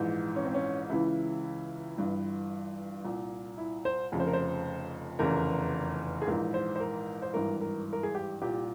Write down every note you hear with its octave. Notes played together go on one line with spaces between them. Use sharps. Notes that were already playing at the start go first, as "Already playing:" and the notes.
Already playing: A#1 G#2 E3
C#4
C4
C#4
C#2 C#3 E3 E4
G1 G2 E3
C2 A#2
E4
C5
F1 F2 C#3
C5
A#4
C5
F1 E2 C#3 E3 A#4
G#4
A#1 G#2 E3 A#4
C5
C5
A#4
C5
G#1 G2 E3 A#4
A#4
A#4
G#4
G4
C2 A#2 G4